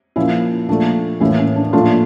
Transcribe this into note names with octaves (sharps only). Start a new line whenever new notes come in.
A#2 F3 A#3 C#4 E4
A#2 F3 A3 D4
A2 E3 A#3 C#4 E4
C#4
D4
A#2 F3 A3 D4 F4